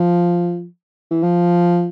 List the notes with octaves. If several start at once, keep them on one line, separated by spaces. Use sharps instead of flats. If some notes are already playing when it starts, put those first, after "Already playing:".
Already playing: F3
E3
F3